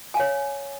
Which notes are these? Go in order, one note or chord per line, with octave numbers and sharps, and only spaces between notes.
C#5 F5 G#5